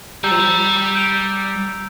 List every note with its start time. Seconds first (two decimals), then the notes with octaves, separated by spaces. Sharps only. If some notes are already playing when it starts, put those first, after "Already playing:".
0.24 G3 A#5 E6 G6
0.31 F3
0.40 G3
0.95 G6 D7 F7